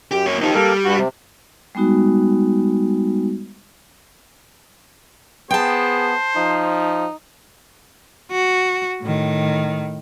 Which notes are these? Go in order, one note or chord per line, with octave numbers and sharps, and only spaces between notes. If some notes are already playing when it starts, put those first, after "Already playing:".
F#2 G4
A#3 C#5
D#3 F3 D#4 G4
G3 A#3 A4 A#4
G2 F#4
C3
G3 G#3 B3 D#4 F#4
B3 G#4 C5 G5 A5
F3 D#4
F#4
A2 D#3